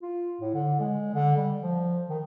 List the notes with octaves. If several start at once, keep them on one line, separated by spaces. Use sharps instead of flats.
F4
A2
D3
G#3
D3
G3
F3
D#3